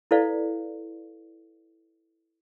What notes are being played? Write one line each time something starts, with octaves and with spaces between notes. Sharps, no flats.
E4 A4 B4 D5 F5